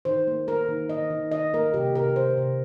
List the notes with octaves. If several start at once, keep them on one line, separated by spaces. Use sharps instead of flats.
D#3 C5
A#3
A#3 A#4
D#3
D#3 D#5
D#3
D#3 D#5
A#3 A#4
C3 G4
C3 A#4
C3 C5
C3